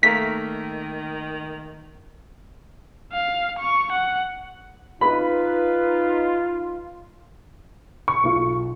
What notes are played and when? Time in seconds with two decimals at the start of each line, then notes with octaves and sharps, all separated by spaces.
0.03 D#3 A3 A#3 A#5 B6
3.13 F5
3.58 C#6
3.92 F#5
5.01 D#4 F4 B4 B5
8.08 C#6
8.24 B1 F4